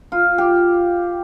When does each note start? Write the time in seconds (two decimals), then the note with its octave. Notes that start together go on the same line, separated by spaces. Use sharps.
0.12 F4
0.38 G4